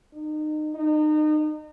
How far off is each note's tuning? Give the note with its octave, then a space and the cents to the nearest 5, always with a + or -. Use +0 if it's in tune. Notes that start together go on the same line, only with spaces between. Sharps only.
D#4 -30
D#4 -35